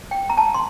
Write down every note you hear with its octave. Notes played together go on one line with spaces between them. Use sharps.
G5
A#5
A5
C6